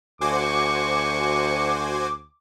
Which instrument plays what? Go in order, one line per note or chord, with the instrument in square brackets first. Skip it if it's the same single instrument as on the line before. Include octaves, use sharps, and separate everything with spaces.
[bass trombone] D2 [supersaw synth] F#4 C5 G#5 [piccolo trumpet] C#6 [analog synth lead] D6